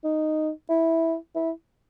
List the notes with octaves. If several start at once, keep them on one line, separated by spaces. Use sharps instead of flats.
D#4
E4
E4